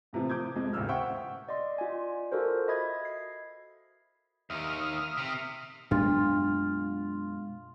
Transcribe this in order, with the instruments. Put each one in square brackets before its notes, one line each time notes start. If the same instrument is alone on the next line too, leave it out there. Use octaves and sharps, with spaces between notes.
[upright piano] A2 C3 E3 F3
D6 D#6 G6 G#6
F2 F3 G#3
A1 D#2 A#2 C#3 E6 F6
C5 E5 F#5 G5 C#6
[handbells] D5 D#5 C6
F4 D5 G#5
F4 F#4 A4 A#4 C5
D#5 E5 B5 D#6 G#6
C7
[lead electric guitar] D#2 D#3 [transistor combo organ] E5 D#6 F6
[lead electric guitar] C3
[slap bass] F#2 A#3 [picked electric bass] B2 G#3 [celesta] D4 [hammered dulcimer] F4